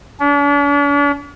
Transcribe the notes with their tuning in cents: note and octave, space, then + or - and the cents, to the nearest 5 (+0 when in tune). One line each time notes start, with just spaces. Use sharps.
D4 -45